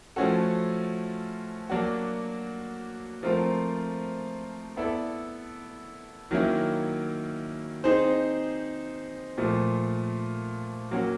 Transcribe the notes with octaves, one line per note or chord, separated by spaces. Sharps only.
F3 A3 C#4 F#4 A4
F#3 A#3 D4 F#4
F3 A3 C4 F4 A#4
B3 E4 A4 D5
D#3 F#3 A#3 C#4 E4
C4 D#4 G#4 C5
A#2 F3 A3
F#3 A#3 C#4 F#4